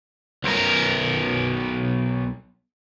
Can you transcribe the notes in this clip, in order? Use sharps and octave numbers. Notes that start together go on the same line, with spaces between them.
B1 A#4